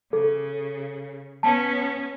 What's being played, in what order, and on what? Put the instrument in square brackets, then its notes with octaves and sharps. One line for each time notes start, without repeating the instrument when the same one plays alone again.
[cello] C#3 [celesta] A4
[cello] B3 C#4 [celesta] A5